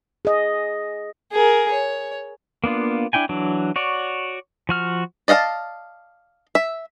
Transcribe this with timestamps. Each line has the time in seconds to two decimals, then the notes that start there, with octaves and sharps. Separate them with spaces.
0.25 G#4 D#5
1.32 G#4 A#4
1.71 C#5
2.64 A#3 B3 D4 F4
3.13 D4 E4 G5 G#5
3.29 E3 F#3 D4
3.76 F#4 C#5 D5
4.69 F3 F#4 F6
5.28 D5 D#5 F5 F#5 A5
6.55 E5